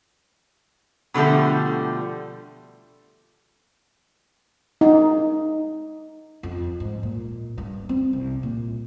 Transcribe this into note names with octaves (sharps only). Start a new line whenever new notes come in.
B2 D3 F3 G3 A3
D#4
F2
G#2
A#2
G2
C4
C2
A#2